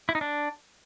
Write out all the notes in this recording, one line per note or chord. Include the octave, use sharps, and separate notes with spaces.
E4
D#4
D4